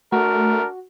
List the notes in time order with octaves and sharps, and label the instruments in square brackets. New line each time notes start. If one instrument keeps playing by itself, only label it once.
[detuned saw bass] A3 [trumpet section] D4 A#4 [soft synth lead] F#4